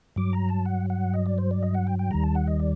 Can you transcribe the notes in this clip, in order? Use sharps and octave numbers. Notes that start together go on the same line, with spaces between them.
G2 F#3 D6
A#5
A5
F#5
F#5
D#5
D5
C5
D5
D#5
F#5
G5
G5
D#2 D#3 G3 A#5
A5
F#5
D#5
D5